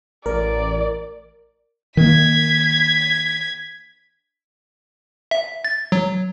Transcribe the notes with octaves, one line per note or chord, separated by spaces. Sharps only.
A1 A#4 D5
D#3 A#3 G#6 B6
E5
A6
F#3